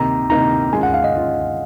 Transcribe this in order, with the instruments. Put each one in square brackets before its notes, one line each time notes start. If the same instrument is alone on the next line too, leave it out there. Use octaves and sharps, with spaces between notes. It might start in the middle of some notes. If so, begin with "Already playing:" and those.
Already playing: [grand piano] C3 D#3 A#3 D#4 [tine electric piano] A#5
[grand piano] C3 D#3 A#3 D#4 [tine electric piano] A#5
[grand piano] D#3 G#3 C#4 F4 [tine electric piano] G#5
[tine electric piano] F#5
F5
D#5
[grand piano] D#3 G#3 C#4 F4